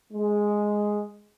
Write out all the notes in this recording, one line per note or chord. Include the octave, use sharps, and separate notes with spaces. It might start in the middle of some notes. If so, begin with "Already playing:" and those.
G#3